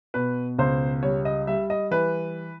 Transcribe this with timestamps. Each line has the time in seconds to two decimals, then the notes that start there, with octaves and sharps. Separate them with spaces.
0.14 B2 B4
0.59 C#2 C5
1.03 G3 C#5
1.25 D#5
1.47 G3 E5
1.70 D#5
1.91 E3 B4